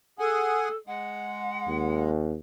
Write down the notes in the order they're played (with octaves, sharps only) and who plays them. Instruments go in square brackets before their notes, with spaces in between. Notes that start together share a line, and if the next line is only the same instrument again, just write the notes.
[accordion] G#4 F#5 G#5 [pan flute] A4
[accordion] G#3 [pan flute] F#5
[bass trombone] D#2